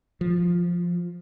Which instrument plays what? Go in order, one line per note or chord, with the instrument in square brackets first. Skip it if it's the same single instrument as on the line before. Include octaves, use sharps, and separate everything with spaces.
[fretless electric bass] F3